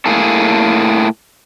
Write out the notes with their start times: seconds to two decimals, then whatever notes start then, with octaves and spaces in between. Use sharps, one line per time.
0.06 A2 A#3 G#4 A4